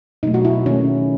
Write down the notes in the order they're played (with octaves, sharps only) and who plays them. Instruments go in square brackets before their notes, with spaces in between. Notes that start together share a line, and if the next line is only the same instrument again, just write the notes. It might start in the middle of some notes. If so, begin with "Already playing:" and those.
[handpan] B2 F#3 A3 D#4
F#4
E4
D#3 A3 C#4